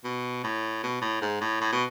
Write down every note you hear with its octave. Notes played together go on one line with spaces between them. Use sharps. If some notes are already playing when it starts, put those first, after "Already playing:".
B2
A2
B2
A2
G#2
A2
A2
B2